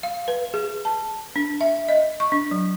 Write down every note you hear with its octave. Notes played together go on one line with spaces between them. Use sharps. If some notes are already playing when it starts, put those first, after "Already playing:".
F5
B4
G#4
A5
D4
E5
D#5
C#6
D4
F#3